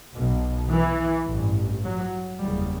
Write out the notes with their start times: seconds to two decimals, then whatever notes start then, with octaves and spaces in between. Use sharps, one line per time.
0.16 B1 B2
0.72 E3
1.28 A1 G2
1.84 F#3
2.40 F#1 E2 C#3 G3